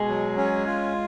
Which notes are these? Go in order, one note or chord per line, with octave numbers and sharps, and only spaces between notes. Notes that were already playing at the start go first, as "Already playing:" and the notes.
Already playing: B2 G#3 G#4
F#3
C#4
F4